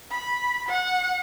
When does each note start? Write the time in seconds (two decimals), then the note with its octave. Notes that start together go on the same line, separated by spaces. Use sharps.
0.11 B5
0.68 F#5